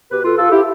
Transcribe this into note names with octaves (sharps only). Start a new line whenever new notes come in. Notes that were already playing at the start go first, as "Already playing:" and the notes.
B2 G4 B4
F4 A4
F4 A4
E4 G4